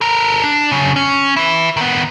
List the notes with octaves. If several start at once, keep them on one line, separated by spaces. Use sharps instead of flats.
A4 A#4
D4
C#3 F#3
C#4
E4 B4
D#3 B3